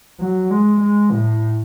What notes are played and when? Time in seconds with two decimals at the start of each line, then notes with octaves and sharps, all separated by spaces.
0.20 F#3
0.51 G#3
0.81 G#3
1.12 A2